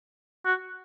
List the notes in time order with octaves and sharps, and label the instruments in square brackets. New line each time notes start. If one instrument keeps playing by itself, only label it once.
[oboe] F#4